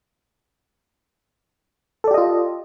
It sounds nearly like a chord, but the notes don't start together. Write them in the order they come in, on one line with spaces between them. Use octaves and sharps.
A4 D5 G4 D#5 F4